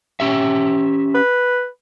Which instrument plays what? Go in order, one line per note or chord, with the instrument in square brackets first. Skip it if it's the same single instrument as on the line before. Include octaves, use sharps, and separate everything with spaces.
[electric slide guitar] C#4 G4 E5
[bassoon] B4